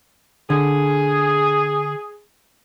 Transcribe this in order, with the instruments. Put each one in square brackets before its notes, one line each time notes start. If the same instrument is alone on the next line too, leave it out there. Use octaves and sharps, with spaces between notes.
[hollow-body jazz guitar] D3 [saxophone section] G#4